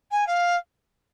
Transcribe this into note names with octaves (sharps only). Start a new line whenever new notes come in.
G#5
F5